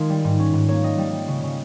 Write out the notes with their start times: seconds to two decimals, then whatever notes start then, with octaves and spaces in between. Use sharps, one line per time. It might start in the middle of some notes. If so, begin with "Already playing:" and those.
Already playing: D#3 G#3 F4 A#4
0.10 G3
0.24 G#2
0.40 C#4
0.54 G#2
0.68 A#3 C#5
0.83 G3 D#5
0.98 G3
1.13 G3
1.28 C#3
1.44 C#3